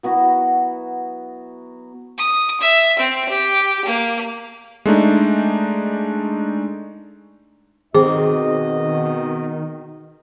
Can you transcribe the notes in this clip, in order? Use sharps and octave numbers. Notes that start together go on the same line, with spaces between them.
F#3 B3 E4 F#4
D#6
E5
C4
G4
A#3
G#3 A3 D4 D#4
B2 D#3 C4 F#4 G#4 D#5